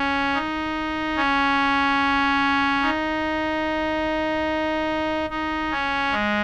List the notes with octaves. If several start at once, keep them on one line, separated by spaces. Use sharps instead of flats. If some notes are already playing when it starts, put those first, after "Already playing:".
Already playing: C#4
D#4
C#4
D#4
D#4
C#4
G#3